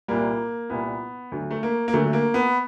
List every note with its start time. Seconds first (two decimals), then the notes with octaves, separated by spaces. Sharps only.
0.08 C2 A#2 G3 A#3
0.70 C2 A#2 G3 B3
1.32 D2 D3 F#3
1.51 A3
1.63 A#3
1.88 A#3
1.93 D2 D3 F#3 A3
2.13 A#3
2.34 B3